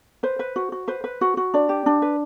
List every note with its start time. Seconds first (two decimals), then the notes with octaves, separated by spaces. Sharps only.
0.23 B4 C5
0.39 B4
0.56 F#4
0.72 F#4
0.88 B4 C5
1.04 B4
1.21 F#4
1.37 F#4
1.54 D4 D5
1.69 G4
1.86 D4
2.02 B4